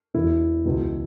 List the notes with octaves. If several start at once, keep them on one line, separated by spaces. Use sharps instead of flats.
E1 E2 B2 E4
C#2 B2